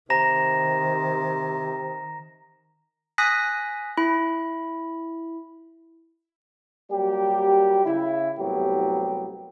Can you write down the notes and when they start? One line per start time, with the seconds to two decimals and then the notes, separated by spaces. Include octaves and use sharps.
0.10 C3 D#3 A#5 A#6 E7
3.18 G#5 D#6 F#6 A#6 B6
3.97 E4 B5
6.91 F#3 G3 A#3 G4
7.84 C#3 E4
8.37 C2 A2 F#3 B3 G4